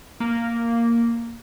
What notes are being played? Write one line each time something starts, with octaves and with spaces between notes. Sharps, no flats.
A#3